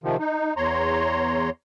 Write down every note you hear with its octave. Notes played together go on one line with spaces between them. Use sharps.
C3 D#3 F3
D#4
E2 C#5 A#5 C6